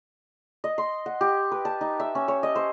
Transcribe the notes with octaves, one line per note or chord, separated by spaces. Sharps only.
D#5
C6
F#5
G4
B4
A5
D#4
E5
C#4
C#5
D#5
C5